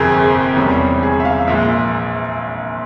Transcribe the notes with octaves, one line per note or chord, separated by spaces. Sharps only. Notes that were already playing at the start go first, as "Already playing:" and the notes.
Already playing: G1 F2 C3 G#4 A#4
G#4
E1 E2 C3 G3 C#4
G#4
E5
F5
A#1 A#2 G#3 E5